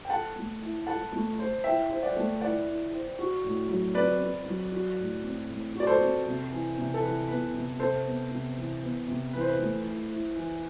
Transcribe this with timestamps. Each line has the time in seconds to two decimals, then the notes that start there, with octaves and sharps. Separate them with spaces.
0.05 G5
0.10 A4 F#5 A5
0.35 A3
0.61 E4
0.87 A4 F#5 A5
1.12 A3
1.39 C5
1.64 E4 E5 G5
1.90 C5
2.03 D5 F#5
2.16 A3
2.41 E4 D5 F#5
2.66 E4
2.92 C5
3.19 F#4
3.44 A2
3.69 F#3
3.94 C4 B4 D5
4.20 C4
4.46 F#3
4.72 F#4
4.98 A2
5.23 C4
5.49 A2
5.75 F#4 D5
5.87 A4 C5
6.00 C4
6.26 C3
6.51 E3
6.77 C3
6.94 A4
7.02 E3 B4
7.28 B3 B4
7.53 C3
7.79 C3 A4 C5
8.05 B3
8.31 C3
8.57 E3
8.82 B3
9.07 C3
9.33 E3 B4
9.41 C5
9.49 B4
9.58 A3
9.84 E4
10.11 E4
10.36 E3